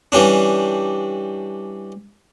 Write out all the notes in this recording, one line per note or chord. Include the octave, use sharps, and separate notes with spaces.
E3 G3 C#4 D4